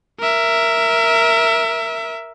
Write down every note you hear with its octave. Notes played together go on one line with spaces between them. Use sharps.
A#4 E5